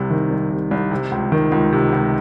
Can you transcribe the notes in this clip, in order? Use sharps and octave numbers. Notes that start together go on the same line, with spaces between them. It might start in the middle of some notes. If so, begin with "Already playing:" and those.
Already playing: C2 C3
D#3
C2
C3
C2
C3
C#2
D#3
C#2
C3
C#2